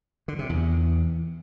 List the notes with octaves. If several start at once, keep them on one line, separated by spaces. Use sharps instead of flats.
D3
C3
E2